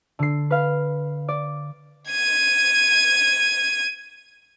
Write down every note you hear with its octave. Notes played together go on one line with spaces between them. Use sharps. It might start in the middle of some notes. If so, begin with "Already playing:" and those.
D3 C7
B4 F5
D5
G#6 D#7